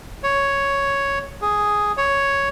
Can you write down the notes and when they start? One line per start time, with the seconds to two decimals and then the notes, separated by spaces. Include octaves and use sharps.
0.23 C#5
1.42 G#4
1.97 C#5